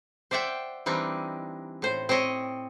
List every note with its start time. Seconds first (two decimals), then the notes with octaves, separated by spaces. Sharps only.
0.31 C5 D5 E5 F#5 G5
0.86 E3 G3 C4 D4 D#4
1.82 A2 C5
2.09 C4 C5 C#5 D#5